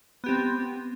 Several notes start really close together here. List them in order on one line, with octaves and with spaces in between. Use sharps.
B3 G4 C4